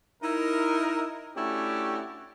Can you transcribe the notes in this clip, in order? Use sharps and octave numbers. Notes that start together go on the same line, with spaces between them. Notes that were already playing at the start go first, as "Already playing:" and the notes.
D#4 E4 A#4
A3 C#4 D4 E4 F#4 G4